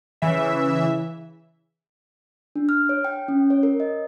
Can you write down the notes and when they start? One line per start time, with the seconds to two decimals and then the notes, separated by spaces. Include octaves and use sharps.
0.22 C#3 E3 E5
2.55 D4
2.69 F6
2.89 C#5
3.04 G5
3.28 C#4
3.50 C#5
3.63 A#4
3.80 D#5